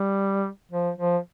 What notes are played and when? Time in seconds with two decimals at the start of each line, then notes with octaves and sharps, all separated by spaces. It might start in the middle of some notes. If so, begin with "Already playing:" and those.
Already playing: G3
0.71 F3
0.98 F3